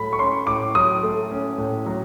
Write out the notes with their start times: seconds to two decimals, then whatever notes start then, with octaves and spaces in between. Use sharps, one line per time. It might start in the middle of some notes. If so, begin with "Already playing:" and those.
Already playing: A2 F#3 A3 B5
0.13 C#6
0.19 C#4 C6
0.47 A2 D6
0.75 F#3 D#6
1.03 A3
1.31 C#4
1.58 A2
1.86 F#3